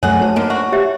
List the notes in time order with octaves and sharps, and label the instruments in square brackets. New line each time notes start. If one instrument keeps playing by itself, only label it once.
[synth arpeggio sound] G2 F#3 A3 [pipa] G#4 F#5 [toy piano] C#5
[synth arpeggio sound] A3 F#4 C5 [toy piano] C#5 A5
[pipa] D3 D#3 [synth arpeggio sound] A#3
[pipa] F#4 [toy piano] C5
[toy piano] G4 C#5 E5